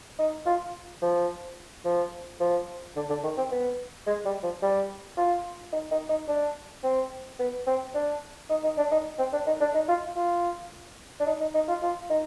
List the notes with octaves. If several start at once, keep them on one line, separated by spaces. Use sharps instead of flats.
D#4
F4
F3
F3
F3
D3
D3
D#3
C4
B3
G#3
G3
F3
G3
F4
D#4
D#4
D#4
D4
C4
B3
C4
D4
D#4
D#4
D4
D#4
C4
D4
D#4
D4
D#4
F4
F4
D4
D#4
D#4
D#4
F4
F4
D#4